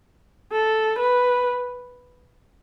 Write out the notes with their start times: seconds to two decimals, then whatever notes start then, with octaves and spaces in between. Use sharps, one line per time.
0.52 A4
0.98 B4